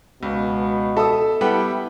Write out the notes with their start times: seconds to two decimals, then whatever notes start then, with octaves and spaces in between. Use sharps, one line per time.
0.23 C#2 B2
0.97 A4 E5 D#6
1.41 G3 B3 E4 G5